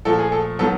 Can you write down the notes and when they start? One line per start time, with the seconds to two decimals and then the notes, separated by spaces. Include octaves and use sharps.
0.05 A#2 F3 A3 A4
0.19 G#4
0.32 A4
0.59 D#3 F#3 B3 A4